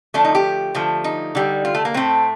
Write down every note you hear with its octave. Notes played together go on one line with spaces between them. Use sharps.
D3 F3 A3 D4
D#4
G4
D3 F3 A3
D#4
D3 G3
F4
A3
A#3
A2 A3 C4